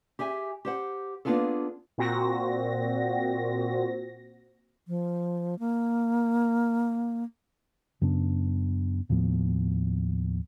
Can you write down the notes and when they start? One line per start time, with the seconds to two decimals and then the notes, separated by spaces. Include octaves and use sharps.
0.19 G4 G#4 E5 G#5
0.65 G4 C5 F#5
1.25 A#3 B3 D4 F4 G#4 A4
1.98 A#2 C4 F#4 A#6
4.88 F3
5.59 A#3
8.01 F#2 C#3 B3 D4
9.09 D#2 A2 F3 B3